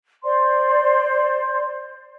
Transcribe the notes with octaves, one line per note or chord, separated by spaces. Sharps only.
C5 D5 C6